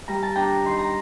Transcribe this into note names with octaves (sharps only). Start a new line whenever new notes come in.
G3 A#5
A5
D4 G5 A#5
D#3 C6
A#5